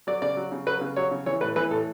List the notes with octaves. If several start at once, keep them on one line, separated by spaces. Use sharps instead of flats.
F#3 D5
C#3 D5
F#3
C#3
F#3 B4
C#3
F#3 C#5
C#3
E3 C#5
A2 B4
E3 B4
A2 A4